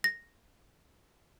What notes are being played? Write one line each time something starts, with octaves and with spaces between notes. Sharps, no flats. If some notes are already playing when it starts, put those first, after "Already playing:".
A#6